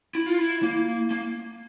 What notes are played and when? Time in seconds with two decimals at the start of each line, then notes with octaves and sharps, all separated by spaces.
0.15 E4
0.26 F4
0.38 E4
0.63 A#3
1.11 A#3